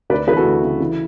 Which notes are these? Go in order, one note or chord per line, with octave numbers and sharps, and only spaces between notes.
D2 B4 D5
E3 G#4 B4
F#4 A4
D2
C#3
E3